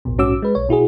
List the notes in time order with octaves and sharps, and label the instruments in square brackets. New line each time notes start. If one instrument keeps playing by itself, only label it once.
[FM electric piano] A1 D#2 B2
A#1 G#2 C#4 F#4 D6 E6
G#3 B4
B1 C#5
B2 E4 F#4 G#4